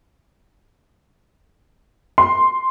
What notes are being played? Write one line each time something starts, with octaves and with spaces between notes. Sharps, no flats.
C6